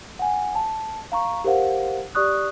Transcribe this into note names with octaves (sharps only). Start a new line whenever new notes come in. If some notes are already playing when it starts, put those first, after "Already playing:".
F#5 G#5
A5
F5 A#5 C#6
G4 A#4 C5 F5 F#5
G4 D5 C#6 D#6 F#6